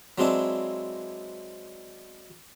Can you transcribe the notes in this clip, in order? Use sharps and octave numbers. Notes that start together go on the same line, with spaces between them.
F#3 G#3 C4 D4 E4